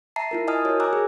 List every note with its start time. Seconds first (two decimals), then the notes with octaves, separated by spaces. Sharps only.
0.16 E5 A5 A#5 C7
0.31 E4 F4 A#4
0.48 D#5 G#5 A5 D#6 F6
0.65 F#4 A#4 C#5
0.80 G#5 A#5 D6 E6 F#6
0.93 G#4